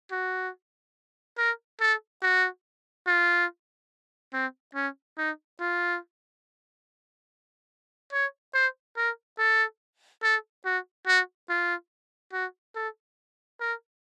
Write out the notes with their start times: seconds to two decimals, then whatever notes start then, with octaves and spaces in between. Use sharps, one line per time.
0.11 F#4
1.38 A#4
1.80 A4
2.22 F#4
3.07 F4
4.33 C4
4.75 C#4
5.18 D#4
5.60 F4
8.13 C#5
8.54 C5
8.97 A#4
9.38 A4
10.23 A4
10.65 F#4
11.07 F#4
11.49 F4
12.33 F#4
12.75 A4
13.60 A#4